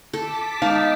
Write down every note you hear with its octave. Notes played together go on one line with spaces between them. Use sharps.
A4 A5 D6 B6
G#3 B3 D#4 B4 F5